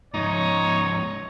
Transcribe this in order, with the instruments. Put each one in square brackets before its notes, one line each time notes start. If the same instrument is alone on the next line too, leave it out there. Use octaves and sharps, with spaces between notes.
[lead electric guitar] G#2 F3 [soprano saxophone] D#4 [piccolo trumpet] C#5